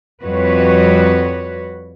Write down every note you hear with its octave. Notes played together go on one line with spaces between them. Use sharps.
F2 G3 F#4 B4 C#5